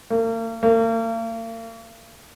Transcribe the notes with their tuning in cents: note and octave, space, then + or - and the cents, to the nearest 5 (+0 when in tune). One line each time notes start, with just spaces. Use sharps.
A#3 -40
A#3 -40